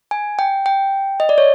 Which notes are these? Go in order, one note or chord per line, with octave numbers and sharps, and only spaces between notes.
G#5
G5
G5
D#5
D5
C#5